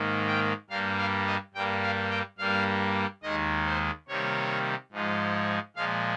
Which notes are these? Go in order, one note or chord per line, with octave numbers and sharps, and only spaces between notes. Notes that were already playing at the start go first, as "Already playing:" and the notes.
Already playing: G#2 D#3 A#3
G5
G2 G3 A#3 F5
F5
D#5
G2 G3 A#3 G5
F5
G5
G2 G3 A#3 F5
D#2 D#3 G#3 D#5
C5
C3 D#3 G3 A#3 C#5
G#2 F3 G#3
A#2 F3 G#3 F5